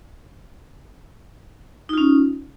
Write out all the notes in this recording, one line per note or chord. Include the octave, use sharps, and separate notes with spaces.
C#4 D#4 F4